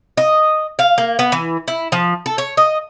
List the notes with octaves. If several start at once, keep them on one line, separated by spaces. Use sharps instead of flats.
D#5
F5
A#3
B3
E3
E4
F3
A4
C#5
D#5